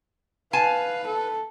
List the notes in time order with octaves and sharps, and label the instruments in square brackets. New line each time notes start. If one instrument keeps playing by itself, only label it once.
[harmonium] B4 [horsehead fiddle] F5 [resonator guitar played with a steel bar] G#5 A5
[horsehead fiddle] A4